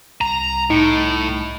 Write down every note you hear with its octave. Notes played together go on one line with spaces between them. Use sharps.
C2 A#5
A2 D#4